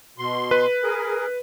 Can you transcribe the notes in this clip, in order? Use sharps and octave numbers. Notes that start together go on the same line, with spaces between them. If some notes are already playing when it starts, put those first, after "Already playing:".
B2 C6
B4
G#4 A#4